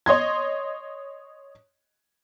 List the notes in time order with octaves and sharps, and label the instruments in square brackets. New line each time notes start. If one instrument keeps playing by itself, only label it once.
[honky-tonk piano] C#5 D#5 C6 G#6